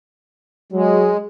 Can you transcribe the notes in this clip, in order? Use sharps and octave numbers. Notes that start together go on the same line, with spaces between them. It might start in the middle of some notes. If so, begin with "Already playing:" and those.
F#3 G#3